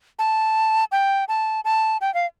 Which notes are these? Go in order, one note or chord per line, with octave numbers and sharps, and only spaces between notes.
A5
G5
A5
A5
G5
F5